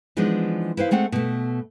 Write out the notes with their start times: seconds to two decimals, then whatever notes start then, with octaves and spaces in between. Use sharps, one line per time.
0.17 E3 F3 G#3 B3 D4 D#4
0.77 E4 B4 C5 F5
0.91 G#3 A3 C4 F#5
1.12 B2 A3